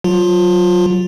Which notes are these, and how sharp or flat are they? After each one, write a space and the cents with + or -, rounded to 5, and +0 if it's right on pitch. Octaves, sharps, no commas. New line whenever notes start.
F#3 +0 F4 +15